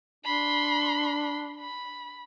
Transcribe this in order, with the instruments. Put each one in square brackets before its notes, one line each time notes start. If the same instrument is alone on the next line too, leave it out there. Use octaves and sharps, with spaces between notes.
[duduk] D4 [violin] B5 C6
[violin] B5